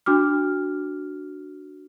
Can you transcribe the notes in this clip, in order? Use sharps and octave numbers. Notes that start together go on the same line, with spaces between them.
D4 F#4 D6 F6